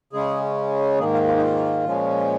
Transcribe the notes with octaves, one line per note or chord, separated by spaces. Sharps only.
C#3 G#3 C#4 G#4
G#2 D#3 A#3 G#4
F4
F4
D#4
F4
A#2 F3 G#3 C#4